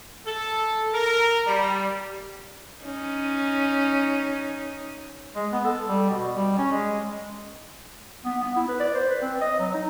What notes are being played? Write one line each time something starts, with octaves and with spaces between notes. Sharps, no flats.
A4
A#4
G3
C#4 D#4
G#3
B3
A4
G3
B2
G3
C#4
G#3
B3
B3
E4
B4
D5
C5
B4
C4
D#5
F#3
D#4